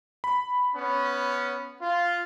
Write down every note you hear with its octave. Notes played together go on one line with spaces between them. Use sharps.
B5
B3 C#4
F4